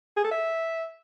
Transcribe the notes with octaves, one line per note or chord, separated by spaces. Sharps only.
G#4
A4
E5